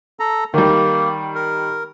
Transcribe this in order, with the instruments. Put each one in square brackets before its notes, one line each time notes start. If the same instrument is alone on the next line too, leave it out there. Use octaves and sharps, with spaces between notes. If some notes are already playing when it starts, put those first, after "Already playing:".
[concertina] A4 A#5
[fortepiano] D#3 G3 [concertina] A#3
[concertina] A#4